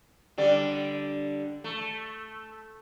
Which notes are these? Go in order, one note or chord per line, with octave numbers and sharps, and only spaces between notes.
D3 G3 D5
A3